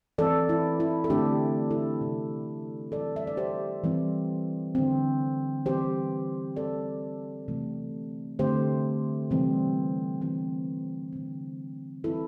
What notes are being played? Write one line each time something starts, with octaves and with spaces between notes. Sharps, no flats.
E3 C4 A4 D5
E4
E4
A4
D3 A3 C4 D4 G4
E4 A4
C3 E3 C4
E3 G3 C4 A4 D5
E5
D5
G4 C5
E3 G3 C4
D3 C4
E3 G3 C4 G4 C5
E3 G3 C4 A4 D5
C3 E3 A3 C4
D3 A3 C4 G4 C5
C3 E3 G3 C4
E3 C4
D3 C4
E3 G3 C4 E4 A4